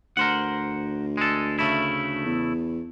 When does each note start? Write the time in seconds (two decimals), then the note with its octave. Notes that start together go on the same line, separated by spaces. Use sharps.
0.17 D2 A#4 C5 F#5
1.17 G#3 A4
1.59 C#3 A3 E4
2.25 E2